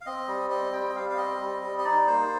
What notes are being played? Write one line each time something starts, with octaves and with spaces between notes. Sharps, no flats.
F5
C4 D#5
G3
C4 D#5
G3 G5
D#5
G3 F5
F5
C4 D#5
G3
G3
D#5
D#4 D5
A#3 C5